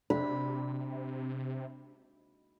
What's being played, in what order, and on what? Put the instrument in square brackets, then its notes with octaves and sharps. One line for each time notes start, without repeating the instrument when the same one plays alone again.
[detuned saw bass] C3 [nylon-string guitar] D4 [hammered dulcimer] B5